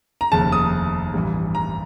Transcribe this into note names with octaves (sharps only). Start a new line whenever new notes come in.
A#5
F1 D#2 C#3 A5
D#6
A1 G2 E3
A#5